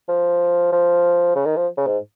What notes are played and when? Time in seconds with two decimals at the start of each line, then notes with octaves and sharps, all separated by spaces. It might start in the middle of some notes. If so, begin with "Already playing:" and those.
0.09 F3
0.73 F3
1.36 C#3
1.46 D#3
1.56 F3
1.77 C#3
1.87 G#2